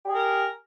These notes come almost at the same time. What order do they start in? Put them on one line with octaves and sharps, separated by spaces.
G4 G#4 A#4